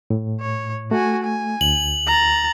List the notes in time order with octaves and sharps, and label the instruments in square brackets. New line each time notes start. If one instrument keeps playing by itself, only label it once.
[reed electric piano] A2
[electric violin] C#5
[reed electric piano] A3 [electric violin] F#4 G#5
[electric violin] G#5
[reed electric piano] D2 [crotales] F#7
[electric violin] A#5 A6